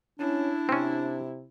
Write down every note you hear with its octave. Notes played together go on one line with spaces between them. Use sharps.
C#4 D4 E4
C3 C4 C#4